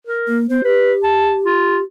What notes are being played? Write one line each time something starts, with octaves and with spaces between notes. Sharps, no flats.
A#4
A#3
B3 C5
G4 B4
A5
F4